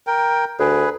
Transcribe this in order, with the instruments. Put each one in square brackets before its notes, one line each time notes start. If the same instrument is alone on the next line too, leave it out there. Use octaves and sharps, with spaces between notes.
[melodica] A#4 G5
[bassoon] D2 [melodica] G#4 B4